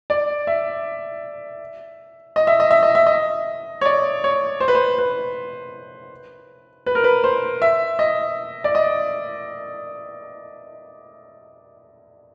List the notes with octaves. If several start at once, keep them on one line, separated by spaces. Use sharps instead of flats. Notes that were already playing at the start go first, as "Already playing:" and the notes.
D5
E5
D#5
E5
D#5
E5
D#5
E5
D#5
C#5
D5
C#5
C5
B4
C5
B4
B4
A#4
B4
C5
E5
D#5
D5
D#5